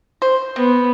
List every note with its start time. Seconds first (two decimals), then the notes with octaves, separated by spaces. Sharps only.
0.22 C5
0.56 B3 C4